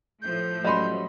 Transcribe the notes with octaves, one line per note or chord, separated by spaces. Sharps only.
A2 F3 A3 G6
F#3 G3 C#4 D#5 B5 C6